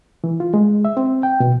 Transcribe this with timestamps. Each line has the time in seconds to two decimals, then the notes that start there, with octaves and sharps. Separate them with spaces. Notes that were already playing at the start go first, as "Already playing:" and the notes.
0.24 E3
0.40 F4
0.54 G#3
0.85 E5
0.97 C4
1.23 G5
1.40 B2